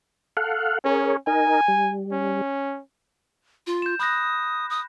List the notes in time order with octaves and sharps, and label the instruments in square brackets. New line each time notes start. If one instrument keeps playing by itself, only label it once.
[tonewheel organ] A4 F5 F#5
[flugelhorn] C#4 [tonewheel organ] G#4 A#4 C#5
[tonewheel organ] D#4 A#4 [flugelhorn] G#5
[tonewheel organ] G3
[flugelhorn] C#4
[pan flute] F4
[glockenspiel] G6 E7
[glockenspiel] B5 F#6 A#6 [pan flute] D#6
[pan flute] D#6